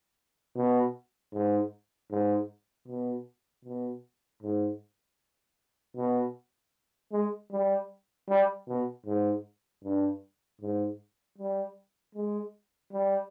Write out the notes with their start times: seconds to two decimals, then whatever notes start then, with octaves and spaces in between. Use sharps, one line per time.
0.56 B2
1.33 G#2
2.11 G#2
2.88 B2
3.65 B2
4.43 G#2
5.97 B2
7.12 G#3
7.52 G3
8.29 G3
8.68 B2
9.06 G#2
9.84 G2
10.61 G#2
11.38 G3
12.15 G#3
12.93 G3